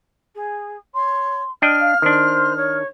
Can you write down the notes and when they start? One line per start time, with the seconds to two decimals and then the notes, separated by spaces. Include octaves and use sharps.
0.35 G#4
0.94 C#5 C6
1.62 D4 D#5 G5 F6
1.80 F5
2.02 D#3 D4 C5
2.56 C#5